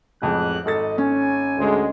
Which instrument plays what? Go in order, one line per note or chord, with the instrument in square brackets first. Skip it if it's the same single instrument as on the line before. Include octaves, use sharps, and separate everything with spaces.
[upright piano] A1 F2 G#3 [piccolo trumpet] F#6
[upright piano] G#1 A4 A6 [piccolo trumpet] D#5
[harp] C#4 [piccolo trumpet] G#5
[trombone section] D2 G#3